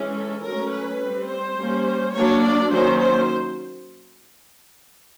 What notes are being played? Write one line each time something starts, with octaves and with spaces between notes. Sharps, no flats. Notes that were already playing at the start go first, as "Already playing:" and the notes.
Already playing: E3 G#3 C#4
A4
F#3 A3 C#4 A#4
B4
G3 C4
C5
G3 A#3 C#4
F#3 A#3 D4 C#5
D5
D#3 F#3 A#3 C#4 C5
C5